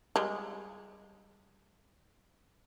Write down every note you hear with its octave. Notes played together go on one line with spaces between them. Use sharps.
G3 G#3